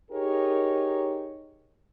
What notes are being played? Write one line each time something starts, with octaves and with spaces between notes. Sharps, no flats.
D#4 G4 G#4 A#4 C#5